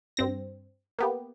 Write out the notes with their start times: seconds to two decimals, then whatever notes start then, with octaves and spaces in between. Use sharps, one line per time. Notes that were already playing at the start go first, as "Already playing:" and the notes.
0.17 G2 C4 A#6
0.99 A#3 B3 G4